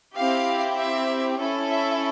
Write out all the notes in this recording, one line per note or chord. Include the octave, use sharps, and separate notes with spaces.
C4 E4 G4 F5
E5
C#4 E4 A4
E5